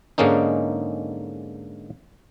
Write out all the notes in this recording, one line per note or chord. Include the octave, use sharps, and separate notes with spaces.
G#2 D3 G#3 A#3 C#4 D#4